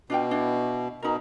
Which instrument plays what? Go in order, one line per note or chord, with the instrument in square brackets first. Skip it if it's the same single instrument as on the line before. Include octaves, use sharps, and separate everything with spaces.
[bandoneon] B2 [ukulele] D4 F4 G5
[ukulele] D4 E4
[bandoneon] B2 [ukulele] D#4 A#4